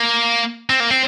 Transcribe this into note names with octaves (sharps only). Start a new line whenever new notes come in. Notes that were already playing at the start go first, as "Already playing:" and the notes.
Already playing: A#3
C4
A#3
C4